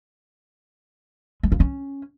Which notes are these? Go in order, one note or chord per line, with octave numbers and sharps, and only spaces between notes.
G#3
A#3
C#4